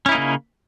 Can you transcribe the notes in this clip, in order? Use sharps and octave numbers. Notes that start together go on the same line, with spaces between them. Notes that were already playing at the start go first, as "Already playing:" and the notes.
C#3 A#3 C#4 D#4 E4